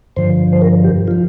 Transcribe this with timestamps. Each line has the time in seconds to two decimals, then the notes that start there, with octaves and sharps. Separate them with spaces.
0.16 G2 D3 F3 C5
0.53 C5
0.62 A#4
0.84 G4
1.08 F4
1.11 F3